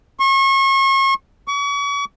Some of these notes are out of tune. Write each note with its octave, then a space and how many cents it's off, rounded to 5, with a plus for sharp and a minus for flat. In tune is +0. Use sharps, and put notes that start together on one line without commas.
C#6 -35
C#6 +40